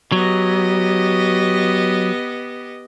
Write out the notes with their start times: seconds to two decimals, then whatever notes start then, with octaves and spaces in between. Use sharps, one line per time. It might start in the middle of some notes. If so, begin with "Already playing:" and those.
0.12 F#3 B3 G4 D#5